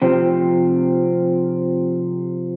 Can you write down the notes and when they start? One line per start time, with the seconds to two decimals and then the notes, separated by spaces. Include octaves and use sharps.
0.02 C3 F3 C4